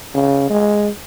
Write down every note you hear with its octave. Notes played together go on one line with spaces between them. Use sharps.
C#3
G#3